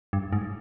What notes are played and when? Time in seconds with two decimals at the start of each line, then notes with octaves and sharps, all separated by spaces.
0.13 G2
0.33 G#2